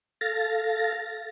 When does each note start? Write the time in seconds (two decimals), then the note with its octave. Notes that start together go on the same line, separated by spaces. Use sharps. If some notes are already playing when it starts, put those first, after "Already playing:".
0.21 A4 F5 A6 A#6